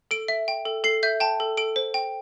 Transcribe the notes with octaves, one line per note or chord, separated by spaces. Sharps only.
A4 D7
E5
G5
A4
A4 C7
E5 G6
G5 A5
A4
A4 D7
C5
G5